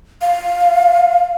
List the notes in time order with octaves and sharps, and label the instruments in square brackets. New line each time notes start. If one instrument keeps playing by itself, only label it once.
[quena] F5